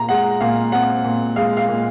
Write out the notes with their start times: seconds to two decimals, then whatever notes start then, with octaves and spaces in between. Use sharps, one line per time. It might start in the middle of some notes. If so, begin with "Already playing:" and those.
Already playing: A#2 A#5
0.09 G#3 F#5
0.41 A#2 F5
0.72 C4 F#5
1.04 A#2
1.36 G#3 F5
1.57 F5
1.68 A#2